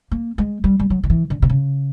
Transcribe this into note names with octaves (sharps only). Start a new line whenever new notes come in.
A#3
G#3
G3
G3
F#3
D#3
E3
D3
C3
C#3